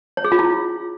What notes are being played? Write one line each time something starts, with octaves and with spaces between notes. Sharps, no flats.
C#5
G#4
F4
E4